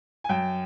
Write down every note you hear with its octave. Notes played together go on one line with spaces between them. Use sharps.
G#5
F#2 G5